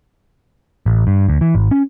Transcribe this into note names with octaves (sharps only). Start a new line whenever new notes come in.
A1
G2
D2
E3
G#1
C#4